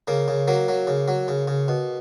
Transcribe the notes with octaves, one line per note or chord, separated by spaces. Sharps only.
C#3 A#3
C#3
F#3 A#3
F#3
C#3
F#3
C#3
C#3
B2